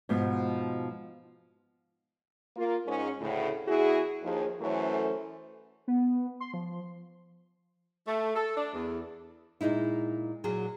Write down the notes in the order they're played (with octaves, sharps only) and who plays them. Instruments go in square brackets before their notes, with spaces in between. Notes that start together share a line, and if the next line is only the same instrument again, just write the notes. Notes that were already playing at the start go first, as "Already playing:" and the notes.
[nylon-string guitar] G#2 B2 F3 B3
[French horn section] A#3 F4
G#2 C#4 G#4
D2 A2 C#3
E2 E4 F#4 G#4
D#2 F3 G#4
F#2 E3 A3 C#4 A4 C5
[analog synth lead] B3
C6
F3
[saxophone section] A3
A4
D4
E2
[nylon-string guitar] A#2 G#3 D#4 E4
A#2 F#3 G#4